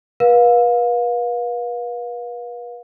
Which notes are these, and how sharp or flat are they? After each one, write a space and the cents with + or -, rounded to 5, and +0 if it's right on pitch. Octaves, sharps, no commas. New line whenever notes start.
B4 -35 F5 +25